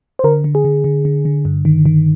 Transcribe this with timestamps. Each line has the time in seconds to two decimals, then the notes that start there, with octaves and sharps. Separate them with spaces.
0.19 C5
0.24 D3 A#4
0.44 D3
0.55 G#4
0.65 D3
0.84 D3
1.05 D3
1.25 D3
1.45 G2
1.65 D#3
1.86 D#3